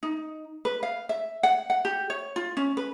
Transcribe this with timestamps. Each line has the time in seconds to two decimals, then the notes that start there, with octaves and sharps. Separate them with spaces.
0.03 D#4
0.65 B4
0.83 F5
1.09 E5
1.43 F#5
1.70 F#5
1.85 G4
2.10 C#5
2.36 F4
2.57 C#4
2.77 B4